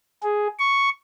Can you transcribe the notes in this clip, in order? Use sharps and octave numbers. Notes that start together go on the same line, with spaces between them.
G#4
C#6